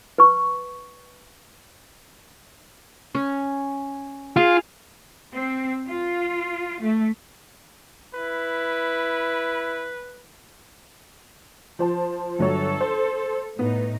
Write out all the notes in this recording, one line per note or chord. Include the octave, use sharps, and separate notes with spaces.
B4 C#6
C#4
F4 G#4 F5
C4
F4
A3
E4 B4
F3 C5 A5
G1 F#3 A4 C#5
C5
A2 B3 D#4